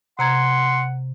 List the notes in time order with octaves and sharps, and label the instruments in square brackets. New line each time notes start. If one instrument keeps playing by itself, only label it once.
[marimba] C3 A#5 G#6 [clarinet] F#5 [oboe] C6